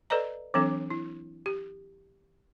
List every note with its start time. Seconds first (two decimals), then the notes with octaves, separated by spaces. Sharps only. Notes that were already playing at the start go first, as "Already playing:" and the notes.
0.10 A4 B4 D5 D#5 A#5
0.54 E3 F#3 C4 D4 A4
0.90 E4
1.46 G4